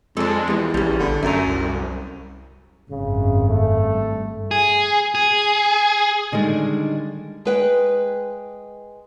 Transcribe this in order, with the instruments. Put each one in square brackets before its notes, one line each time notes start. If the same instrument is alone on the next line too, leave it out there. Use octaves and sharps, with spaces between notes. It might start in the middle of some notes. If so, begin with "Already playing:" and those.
[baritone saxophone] F2 [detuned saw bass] G#3 [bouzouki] D4 A4
[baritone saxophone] E2 [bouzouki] G3 A#3
[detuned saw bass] A#1 [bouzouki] G3 C#4
[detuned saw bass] G1 [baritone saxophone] D3
[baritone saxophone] F#2 [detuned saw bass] A3 [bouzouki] G#5 A#5
[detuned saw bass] C2
[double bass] G#1 F#2 [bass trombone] C#3
[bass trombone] A3
[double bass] G2
[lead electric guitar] G#4
G#4
[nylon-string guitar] D3 D#3 G3 G#3
G#3 B4 G5